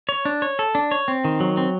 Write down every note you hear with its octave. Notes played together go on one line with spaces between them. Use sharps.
C#5
D4
C#5
A4
D4
C#5
C4
D#3
F#3
C4